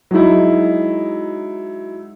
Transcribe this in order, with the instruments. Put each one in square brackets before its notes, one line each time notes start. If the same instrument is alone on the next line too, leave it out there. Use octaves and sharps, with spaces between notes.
[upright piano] F#3 G#3 D#4 E4